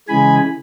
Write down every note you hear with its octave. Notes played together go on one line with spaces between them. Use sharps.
C#3 E3 G#3 G#5 B5